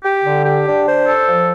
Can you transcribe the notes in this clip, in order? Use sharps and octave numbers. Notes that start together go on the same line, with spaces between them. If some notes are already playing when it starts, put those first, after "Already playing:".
G4
D3
G4
D4
C5
A4
F3